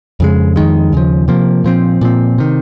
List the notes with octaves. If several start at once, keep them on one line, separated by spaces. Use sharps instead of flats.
F2 C#3 G#3
F2 D#3 G#3
D#2 C#3 F3
C3 F3 A#3
A#2 F3 C4
A#2 F3 C4
C3 D#3